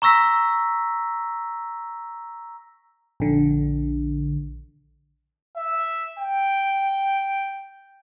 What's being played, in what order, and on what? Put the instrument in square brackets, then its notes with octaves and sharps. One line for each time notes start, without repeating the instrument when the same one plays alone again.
[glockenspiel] A#5 C#6 E6 A#6 B6
[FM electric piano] A#1 D3
[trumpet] E5
G5